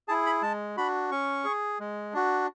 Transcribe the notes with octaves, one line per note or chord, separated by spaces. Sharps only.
E4 G#4 A5
B5
G#3 A5
D4 F#4 B5
C#4 C#6
G#4
G#3
D4 F#4